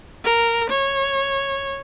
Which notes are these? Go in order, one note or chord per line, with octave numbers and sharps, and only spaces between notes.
A#4
C#5